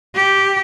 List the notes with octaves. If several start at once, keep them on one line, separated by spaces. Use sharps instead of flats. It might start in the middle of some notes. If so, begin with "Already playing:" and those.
G4